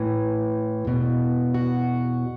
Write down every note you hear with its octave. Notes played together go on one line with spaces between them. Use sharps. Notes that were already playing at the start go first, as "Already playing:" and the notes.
Already playing: A2 E3
E2 B2
F#4